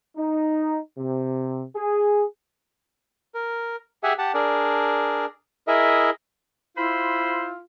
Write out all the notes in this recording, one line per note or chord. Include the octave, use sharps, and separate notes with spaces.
D#4
C3
G#4
A#4
G4 G#4 E5 F#5 G#5
G4 F#5 A5
D4 G#4 A#4 D5
E4 G#4 A#4 D#5 E5
E4 F4 C5 B5